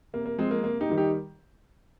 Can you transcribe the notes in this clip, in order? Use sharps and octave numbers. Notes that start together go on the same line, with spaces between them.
C3 A#3
A#3
F3 G#3 C4
A#3
C3 A#3
D#4 G4
D#3 G3
D#4 G4